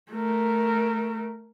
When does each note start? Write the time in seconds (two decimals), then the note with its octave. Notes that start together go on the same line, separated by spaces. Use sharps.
0.11 A3 A#4